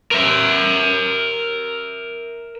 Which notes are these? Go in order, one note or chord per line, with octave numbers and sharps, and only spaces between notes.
A#4 E5